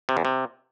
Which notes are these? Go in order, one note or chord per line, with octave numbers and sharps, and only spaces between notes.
C3
E2
C3